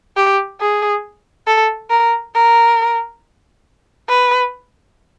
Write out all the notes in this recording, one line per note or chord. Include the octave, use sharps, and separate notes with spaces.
G4
G#4
A4
A#4
A#4
B4